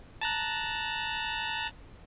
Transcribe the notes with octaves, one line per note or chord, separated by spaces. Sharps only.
A5 A#5 F#6